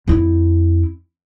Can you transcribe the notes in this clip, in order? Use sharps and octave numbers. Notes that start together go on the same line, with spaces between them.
F2 E4